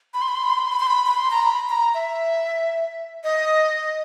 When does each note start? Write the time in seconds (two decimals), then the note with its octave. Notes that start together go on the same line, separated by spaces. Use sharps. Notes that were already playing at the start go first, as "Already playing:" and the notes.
0.14 B5
0.22 C6
0.28 B5
0.35 C6
0.43 B5
0.50 C6
0.58 B5
0.64 C6
0.72 B5
0.80 C6
0.87 B5
1.06 B5
1.17 C6
1.31 A#5
1.43 B5
1.69 A#5
1.94 E5
3.24 D#5